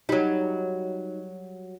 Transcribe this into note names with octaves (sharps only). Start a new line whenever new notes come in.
F#3 G3 D#4